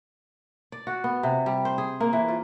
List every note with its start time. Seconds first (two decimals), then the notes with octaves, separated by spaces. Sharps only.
0.72 D5
0.87 F#4
1.04 B3
1.23 C3
1.46 G3
1.65 C5
1.78 G#4
2.00 A#3
2.13 E3
2.28 F4